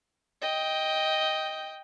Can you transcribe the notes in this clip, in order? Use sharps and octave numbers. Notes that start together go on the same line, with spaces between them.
D#5 G5